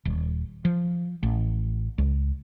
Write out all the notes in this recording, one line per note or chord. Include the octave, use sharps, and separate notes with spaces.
D#1
F3
A1
C#2